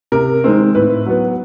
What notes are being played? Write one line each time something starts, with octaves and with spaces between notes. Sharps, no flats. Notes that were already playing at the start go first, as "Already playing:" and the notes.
C3 A#4
D#3 G#3 C4
A2 B4
F#3 B3